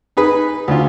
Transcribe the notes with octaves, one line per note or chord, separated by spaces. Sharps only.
D#4 G#4 B4
D2 F4